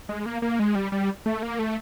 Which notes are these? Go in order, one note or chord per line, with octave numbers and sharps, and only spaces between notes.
G#3
A#3
A#3
G#3
G3
G3
A3
A#3
A3